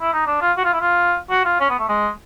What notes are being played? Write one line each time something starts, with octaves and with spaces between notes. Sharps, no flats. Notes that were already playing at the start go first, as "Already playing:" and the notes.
E4
D#4
D4
F4
F#4
F4
E4
F4
F#4
F4
C#4
B3
A3
G#3